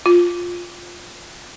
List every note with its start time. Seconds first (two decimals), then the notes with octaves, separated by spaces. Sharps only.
0.06 F4